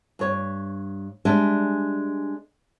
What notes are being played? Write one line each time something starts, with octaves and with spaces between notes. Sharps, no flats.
G2 C#5
G3 G#3 D4 G#4 E5